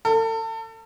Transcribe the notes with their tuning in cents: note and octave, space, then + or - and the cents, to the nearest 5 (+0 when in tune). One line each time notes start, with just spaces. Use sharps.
A4 +35